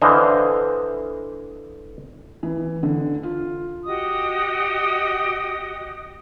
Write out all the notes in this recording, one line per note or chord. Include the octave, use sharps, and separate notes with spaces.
D3 E3 C5 D#5 F5
E3
D3
F4
F#4 G4 D#5 D#6